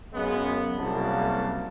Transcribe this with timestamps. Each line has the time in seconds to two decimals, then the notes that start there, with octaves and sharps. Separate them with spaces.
0.14 F#2 C#3 G#3 B3
0.78 C2 F#2 C#3 A#3 F#4 A5